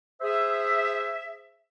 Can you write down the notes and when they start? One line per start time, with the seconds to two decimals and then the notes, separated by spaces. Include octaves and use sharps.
0.22 G#4 C5 E5